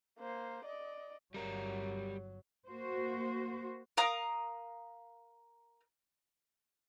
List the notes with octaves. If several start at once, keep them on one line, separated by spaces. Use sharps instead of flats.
A#3 C5
D5 D#5
G1 F#3 G3 A#4
A#3 F#4 C5
A#4 F5 A#5 D#6